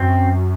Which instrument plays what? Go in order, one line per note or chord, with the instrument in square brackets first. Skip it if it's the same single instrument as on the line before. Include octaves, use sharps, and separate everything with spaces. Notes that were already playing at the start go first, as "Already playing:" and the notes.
Already playing: [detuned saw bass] F#2 [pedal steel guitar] C4